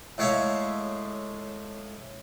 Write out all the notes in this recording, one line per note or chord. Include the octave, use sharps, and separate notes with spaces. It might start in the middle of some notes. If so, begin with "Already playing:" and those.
A2 G#3 C#5 E5 F5